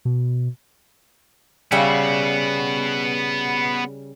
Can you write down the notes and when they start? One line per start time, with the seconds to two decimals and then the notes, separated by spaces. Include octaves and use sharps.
0.05 B2
1.72 C#3 G3 B3 F#4 E5